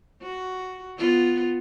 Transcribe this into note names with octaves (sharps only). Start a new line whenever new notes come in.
F#4
B3 F4